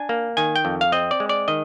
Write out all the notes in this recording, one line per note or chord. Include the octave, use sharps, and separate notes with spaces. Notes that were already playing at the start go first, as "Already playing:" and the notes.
Already playing: D4 G#5
A#3
D#3 G#5
G5
F2
F5
C4 D#5
D5
G#3
D5
D#3 D#5